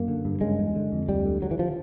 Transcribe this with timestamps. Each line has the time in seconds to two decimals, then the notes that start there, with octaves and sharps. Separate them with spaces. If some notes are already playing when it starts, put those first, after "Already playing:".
Already playing: F#2 A#3
0.08 D3
0.25 G2
0.41 C#3 G#3
0.59 E2
0.76 D3
0.92 F2
1.08 D2 G3
1.26 D3
1.42 D3 F#3
1.51 E3
1.59 F3